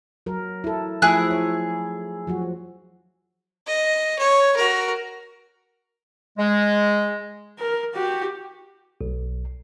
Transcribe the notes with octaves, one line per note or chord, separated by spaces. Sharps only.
F#3 A#4
E4 A4
F3 A3 E4 G#4 F#6
C#5
F3 F#3 F#4
D#5
C#5
F#4 A#4
G#3
A#4
F#4 G4
B1